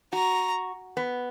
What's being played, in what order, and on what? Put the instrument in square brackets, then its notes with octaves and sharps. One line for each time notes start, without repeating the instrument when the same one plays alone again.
[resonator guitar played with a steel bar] F#4 [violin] A#5
[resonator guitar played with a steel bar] B3